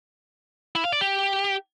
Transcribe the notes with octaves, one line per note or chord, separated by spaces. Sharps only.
E4
F5
D5
G4